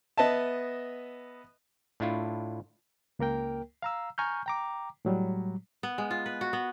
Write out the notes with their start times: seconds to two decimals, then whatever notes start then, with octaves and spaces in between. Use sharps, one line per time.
0.17 B3 D#5 E5 A5
2.00 A2 D4 E4 F4
3.19 C#2 A#3 A#4 G5
3.82 F5 A#5 E6
4.18 G#5 A#5 C#6 F6 G6
4.46 G5 A#5 D6
5.05 A2 F#3 G3
5.83 B3
5.98 G#3
6.11 F4
6.26 B4
6.41 F#4
6.53 B3